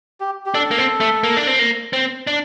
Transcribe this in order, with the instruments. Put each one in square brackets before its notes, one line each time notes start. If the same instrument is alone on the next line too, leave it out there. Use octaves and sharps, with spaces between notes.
[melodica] G4
G4
[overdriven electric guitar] D4 [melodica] A4
[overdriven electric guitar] A#3
C4
A3
A#3
D4
C4
A#3
C4
D4